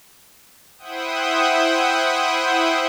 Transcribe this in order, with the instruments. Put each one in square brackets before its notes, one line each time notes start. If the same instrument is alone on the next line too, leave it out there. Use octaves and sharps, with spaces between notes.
[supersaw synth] E4 C5 E5 F#5 G5 D#6